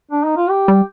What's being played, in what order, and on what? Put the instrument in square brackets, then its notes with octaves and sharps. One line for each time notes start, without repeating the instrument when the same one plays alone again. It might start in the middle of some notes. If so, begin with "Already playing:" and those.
[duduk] D4
D#4
F4
G4
[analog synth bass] G3